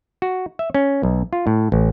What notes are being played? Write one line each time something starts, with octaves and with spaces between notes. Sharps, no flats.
F#4
E5
C#4
B1
F4
A2
A1